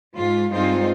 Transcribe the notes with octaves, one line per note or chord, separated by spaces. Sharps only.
G#2 F4
G2 G#3 C4 D#4 F4 C5